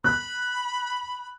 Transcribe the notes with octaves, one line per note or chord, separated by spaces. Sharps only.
B5 F#6